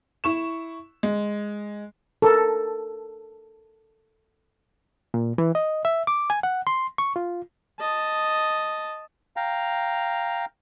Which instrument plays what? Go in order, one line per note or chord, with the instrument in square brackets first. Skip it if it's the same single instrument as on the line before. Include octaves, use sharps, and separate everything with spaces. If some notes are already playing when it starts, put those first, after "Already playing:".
[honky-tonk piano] E4 C#6 E7
G#3
[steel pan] A4 A#4
[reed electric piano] A#2
E3
D#5
E5
D6
G#5
F#5
C6
C#6
F4
[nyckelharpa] D#5 A5
[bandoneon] F5 G5 A#5